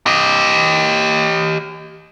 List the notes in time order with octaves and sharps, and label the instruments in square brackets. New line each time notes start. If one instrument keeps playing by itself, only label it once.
[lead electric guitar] G4 D#5